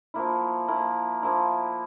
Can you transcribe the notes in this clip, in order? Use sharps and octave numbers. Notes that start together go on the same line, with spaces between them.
F3 A#3 E4
F3 A#3 E4
F3 A#3 E4